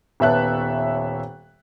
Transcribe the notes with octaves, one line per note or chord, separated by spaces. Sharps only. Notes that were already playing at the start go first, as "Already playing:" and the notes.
D#1 B3 C#5 E5 A5 F#6